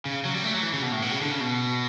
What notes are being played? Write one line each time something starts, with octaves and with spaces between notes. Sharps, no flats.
C#3
F#3
G3
A3
F#3
E3
C#3
B2
A2
B2
C#3
D3
C#3
B2